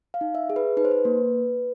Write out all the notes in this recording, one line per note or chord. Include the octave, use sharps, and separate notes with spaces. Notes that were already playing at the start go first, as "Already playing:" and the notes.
F5
D#4
E5
G#4
B4
D#4 B4
C5
B4
A#3